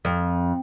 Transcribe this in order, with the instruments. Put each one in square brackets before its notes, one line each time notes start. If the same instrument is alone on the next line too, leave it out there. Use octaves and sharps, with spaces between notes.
[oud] F2